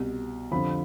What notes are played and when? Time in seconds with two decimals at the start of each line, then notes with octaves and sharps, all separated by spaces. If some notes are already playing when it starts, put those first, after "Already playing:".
Already playing: C2 B2
0.51 F2 D3 F3 B5